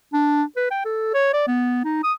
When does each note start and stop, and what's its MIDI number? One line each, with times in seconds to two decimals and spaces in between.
0.13 0.43 62
0.57 0.67 71
0.71 0.85 79
0.85 1.10 69
1.14 1.31 73
1.34 1.45 74
1.48 1.82 59
1.85 1.99 63
2.04 2.13 87